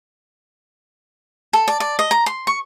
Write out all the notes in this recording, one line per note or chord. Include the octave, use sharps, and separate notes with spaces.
A4
D5
D5
D#5
A#5
C6
C#6